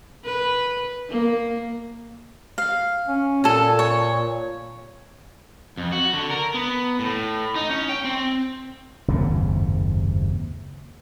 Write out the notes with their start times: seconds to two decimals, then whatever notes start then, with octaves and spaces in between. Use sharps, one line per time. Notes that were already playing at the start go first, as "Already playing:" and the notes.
0.25 B4
1.10 A#3
2.58 F5
3.08 C#4
3.44 A#2 A4 G#5
3.79 C#5
5.77 F2
5.92 F#4
6.14 D3
6.30 A#4
6.54 B3
6.99 A2
7.56 D#4
7.70 C#4
7.89 G5
8.04 C4
9.08 F#1 D#2 G#2 C3